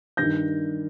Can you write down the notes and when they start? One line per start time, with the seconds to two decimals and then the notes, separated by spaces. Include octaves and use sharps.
0.17 G2 D#3 G6 A#6